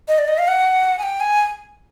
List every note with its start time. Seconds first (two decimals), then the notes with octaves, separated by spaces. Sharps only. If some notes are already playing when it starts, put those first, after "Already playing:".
0.08 D#5
0.18 D5
0.28 D#5
0.38 F5
0.48 F#5
0.99 G#5
1.03 G5
1.20 G#5